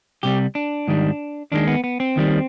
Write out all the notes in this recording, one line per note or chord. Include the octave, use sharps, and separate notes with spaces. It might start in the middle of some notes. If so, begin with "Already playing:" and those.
C2 C3 G3 G4
D4
G#2 D#3 G3
D#2 D#3 G#3 D4
B3
B3
C4
D#2 D#3 G3